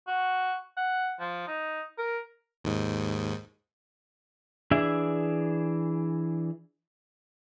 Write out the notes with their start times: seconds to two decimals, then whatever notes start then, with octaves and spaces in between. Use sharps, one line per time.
0.07 F#4
0.77 F#5
1.20 F3
1.47 D#4
1.98 A#4
2.64 D#2 G#2
4.71 E3 D4 G#4 E5